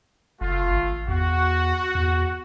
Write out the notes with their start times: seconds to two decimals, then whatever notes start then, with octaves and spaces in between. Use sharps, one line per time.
0.41 F#1 A3 F4
0.70 G#1
1.08 E2 F#4
1.95 E2